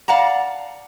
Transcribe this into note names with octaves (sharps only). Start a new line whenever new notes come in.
D5 F5 F#5 A5 A#5